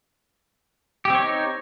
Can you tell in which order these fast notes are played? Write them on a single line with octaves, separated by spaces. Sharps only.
G4 C4 C#5 D#4